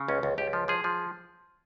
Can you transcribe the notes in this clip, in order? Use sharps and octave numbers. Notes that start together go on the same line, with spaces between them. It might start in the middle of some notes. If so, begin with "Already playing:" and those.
Already playing: C#3
C#2 C#4
C#2
C#2 G4
F3
F3 G#4
F3